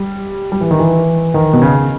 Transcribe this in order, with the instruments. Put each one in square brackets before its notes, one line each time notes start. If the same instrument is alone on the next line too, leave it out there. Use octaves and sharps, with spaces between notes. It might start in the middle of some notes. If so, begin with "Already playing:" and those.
Already playing: [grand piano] G3
G3
E3
D#3
E3
D#3
B2
C#3